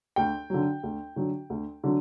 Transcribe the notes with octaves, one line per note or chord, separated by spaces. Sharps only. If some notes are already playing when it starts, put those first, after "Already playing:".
D2 G5
D3 F#3
D2
D3 F#3
D2
D3 F#3